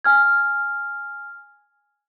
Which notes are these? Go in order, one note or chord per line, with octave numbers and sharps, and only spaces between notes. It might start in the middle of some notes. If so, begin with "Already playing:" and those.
G#5 F6 G#6